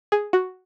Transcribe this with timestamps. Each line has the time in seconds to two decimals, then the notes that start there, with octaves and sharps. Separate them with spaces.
0.12 G#4
0.33 F#4